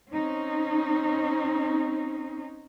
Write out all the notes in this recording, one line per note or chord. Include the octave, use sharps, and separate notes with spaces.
C4 C#4 D#4